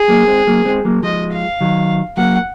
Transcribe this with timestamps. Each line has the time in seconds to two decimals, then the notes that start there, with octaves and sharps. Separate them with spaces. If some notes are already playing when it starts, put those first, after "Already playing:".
Already playing: G#4
0.08 F#3 A#3
0.27 G#3 C4
0.47 F#3 A#3
0.65 G#3 C4
0.85 F#3 A#3
1.03 F3 G#3 D#5
1.32 F5
1.61 D#3 F#3
2.17 F#3 A#3 F#5